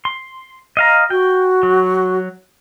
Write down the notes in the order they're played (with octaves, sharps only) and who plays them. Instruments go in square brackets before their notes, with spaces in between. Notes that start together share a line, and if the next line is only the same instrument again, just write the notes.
[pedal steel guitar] C6
D#5 F5 A#5
[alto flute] F#4 [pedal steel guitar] G5
[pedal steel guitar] F#3